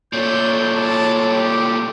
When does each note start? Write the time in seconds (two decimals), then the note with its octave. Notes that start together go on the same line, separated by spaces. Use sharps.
0.13 A#2 A3 C#5 D5 G6
0.75 A5
1.32 G4